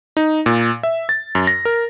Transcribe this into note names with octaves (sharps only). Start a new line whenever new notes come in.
D#4
A#2
E5
A6
F#2
A#6
A#4